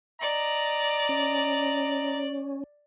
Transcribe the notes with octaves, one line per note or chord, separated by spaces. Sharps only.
D5 D#5 A#5
C#4